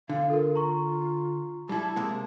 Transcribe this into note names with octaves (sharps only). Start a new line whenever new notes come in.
D3 D4 F5
F4 A4 A#4
A#5 C#6
G3 E4 A5
C3 G#3 A#3